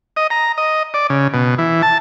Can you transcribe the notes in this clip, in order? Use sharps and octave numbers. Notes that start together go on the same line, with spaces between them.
D#5
A#5
D#5
D5
C#3
B2
E3
A5